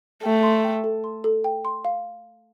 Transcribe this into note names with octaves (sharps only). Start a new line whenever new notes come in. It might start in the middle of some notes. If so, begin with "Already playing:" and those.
A3 G5
C6
G5
A4
C6
A4
G5
C6
F5